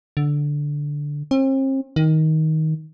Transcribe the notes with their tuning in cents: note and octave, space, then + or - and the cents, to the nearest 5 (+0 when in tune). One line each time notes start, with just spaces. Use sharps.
D3 -5
C4 +40
D#3 +15